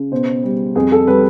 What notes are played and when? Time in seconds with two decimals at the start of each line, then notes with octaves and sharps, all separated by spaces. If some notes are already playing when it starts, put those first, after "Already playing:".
Already playing: C#3
0.12 B2 C5
0.44 G3
0.75 F2 G#4
0.92 A4
1.07 G3 B4